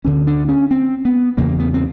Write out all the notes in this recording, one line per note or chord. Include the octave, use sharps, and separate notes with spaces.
D2 D3 C#4
D4
C#4
C4
B3
E2 C#3 A#3
B3
C4